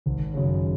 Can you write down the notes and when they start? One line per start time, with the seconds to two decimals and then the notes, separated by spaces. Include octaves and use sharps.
0.06 G#1
0.34 F#2 C#3